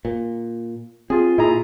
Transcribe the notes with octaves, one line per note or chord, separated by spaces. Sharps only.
A#2
C4 F4 G#4
A#2 E4 G#4 A#5